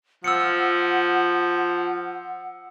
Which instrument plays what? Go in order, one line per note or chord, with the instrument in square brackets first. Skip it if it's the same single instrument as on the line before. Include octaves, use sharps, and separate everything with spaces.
[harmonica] F3 [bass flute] F#5 [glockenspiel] E6 C#7